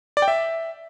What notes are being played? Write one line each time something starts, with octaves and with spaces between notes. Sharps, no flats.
D5
G5
E5